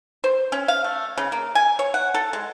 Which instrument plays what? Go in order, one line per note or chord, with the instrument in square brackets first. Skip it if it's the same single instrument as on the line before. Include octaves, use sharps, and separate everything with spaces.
[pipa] C5
C#4
F5
A3
C#3
A#3
G#5
C#5
F#5
A4
G#3